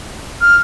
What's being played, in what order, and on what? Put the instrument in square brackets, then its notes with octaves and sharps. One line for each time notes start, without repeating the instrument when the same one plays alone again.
[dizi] F6